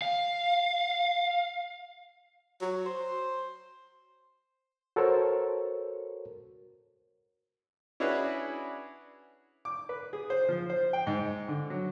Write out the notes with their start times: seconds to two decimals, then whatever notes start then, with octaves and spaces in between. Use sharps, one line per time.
0.02 F5
2.61 F#3
2.86 C5
4.96 F#4 A4 A#4 C5 C#5
8.00 C#4 D4 E4 F#4 G#4 B4
9.65 D6
9.89 B4
10.13 G#4
10.30 C5
10.49 F3
10.70 C5
10.93 G5
11.07 G#2
11.48 D3
11.70 F#3